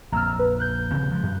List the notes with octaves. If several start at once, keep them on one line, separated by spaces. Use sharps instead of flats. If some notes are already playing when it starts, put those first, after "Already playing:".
A#1 F2 A#5 E6 F6
B4
F#6 G6
D#1 C#3 C4
F3 G#3
F#2